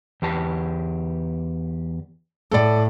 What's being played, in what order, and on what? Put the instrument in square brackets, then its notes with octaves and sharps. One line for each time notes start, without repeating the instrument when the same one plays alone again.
[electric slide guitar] E2 G4 A5
[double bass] A2 [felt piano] A4 D5